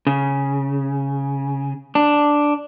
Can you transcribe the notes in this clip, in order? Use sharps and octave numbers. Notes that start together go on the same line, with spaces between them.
C#3
D4